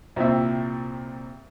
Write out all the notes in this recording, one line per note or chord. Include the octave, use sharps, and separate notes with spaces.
C2 A#2 C4 E5